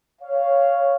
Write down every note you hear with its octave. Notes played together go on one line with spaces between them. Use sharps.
C#5 F5